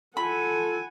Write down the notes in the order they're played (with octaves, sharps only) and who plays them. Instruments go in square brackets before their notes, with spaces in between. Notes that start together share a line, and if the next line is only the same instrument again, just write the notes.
[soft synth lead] F4 [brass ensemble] A4 [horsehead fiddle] F#5 G#5 [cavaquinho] B5